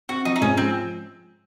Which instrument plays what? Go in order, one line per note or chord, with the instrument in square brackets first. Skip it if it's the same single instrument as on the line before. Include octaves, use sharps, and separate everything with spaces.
[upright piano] C4 [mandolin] F#4
[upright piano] F3 [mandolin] D#4
[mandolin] D#4
[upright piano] G#2 [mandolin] C#4
[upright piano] F3 [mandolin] C4